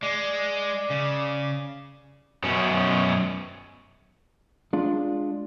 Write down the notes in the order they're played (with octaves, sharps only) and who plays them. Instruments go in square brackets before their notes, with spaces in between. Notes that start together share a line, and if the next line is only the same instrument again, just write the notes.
[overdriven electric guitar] G#3 [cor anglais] D5
[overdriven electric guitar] C#3
[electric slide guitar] F#2 B2 C#4
[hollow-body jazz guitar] G#3 D4 F4